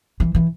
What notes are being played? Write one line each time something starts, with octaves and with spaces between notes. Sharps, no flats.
E3
E3